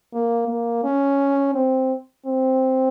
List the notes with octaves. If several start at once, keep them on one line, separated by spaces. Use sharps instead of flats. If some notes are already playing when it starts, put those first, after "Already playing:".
A#3
A#3
C#4
C4
C4